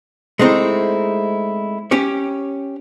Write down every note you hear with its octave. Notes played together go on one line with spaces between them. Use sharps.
G#3 A3 C4 D#4 E4
C#4 G4 C#5